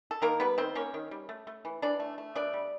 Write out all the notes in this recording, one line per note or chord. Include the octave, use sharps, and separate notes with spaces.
A4
D#3 A#3 A#4
G3 B3 B4
D#3 C4 C5
A#3 C#4 C#5
D#3
G3
A3
A3
E3
E3 D4 D5
A3
A3
B2 D4 D5
G3